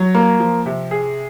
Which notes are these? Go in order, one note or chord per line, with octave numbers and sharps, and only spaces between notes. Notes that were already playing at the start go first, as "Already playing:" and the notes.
Already playing: F#3
A#3
F3
C3
G#4